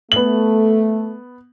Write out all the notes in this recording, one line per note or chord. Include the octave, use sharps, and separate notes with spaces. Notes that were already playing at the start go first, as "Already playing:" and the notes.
A3 B3 F#7